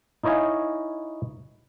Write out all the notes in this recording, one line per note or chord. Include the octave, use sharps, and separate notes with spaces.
D#4 E4 C#5 D#5 F5 G#5